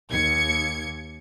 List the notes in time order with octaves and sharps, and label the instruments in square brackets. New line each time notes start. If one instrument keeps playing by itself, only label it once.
[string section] D#2 G#6 C#7